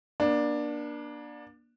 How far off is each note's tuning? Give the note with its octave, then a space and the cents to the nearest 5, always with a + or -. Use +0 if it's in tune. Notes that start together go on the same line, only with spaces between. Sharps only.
A#3 +45 D4 +10